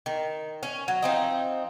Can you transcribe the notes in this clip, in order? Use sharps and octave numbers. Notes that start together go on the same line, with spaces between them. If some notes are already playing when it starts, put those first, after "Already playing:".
D#3
C#4
F#3
F3 C4 D#4